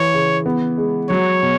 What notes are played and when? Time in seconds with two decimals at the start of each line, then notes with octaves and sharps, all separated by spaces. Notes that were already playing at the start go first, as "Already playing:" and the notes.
Already playing: E3 C#5
0.14 C#3
0.46 B3
0.78 G#3
1.09 F#3 C#5
1.42 B2